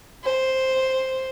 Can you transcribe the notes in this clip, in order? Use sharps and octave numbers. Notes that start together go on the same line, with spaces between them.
C5